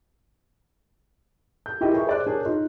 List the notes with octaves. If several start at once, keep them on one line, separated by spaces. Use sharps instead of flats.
G6
E4 F4 G4 G#4 A#4 D#5
G4 G#4 A#4 B4 E5 C#6
C5 D5 F#6
D4 G#4 A#4 C#5
D#4 F4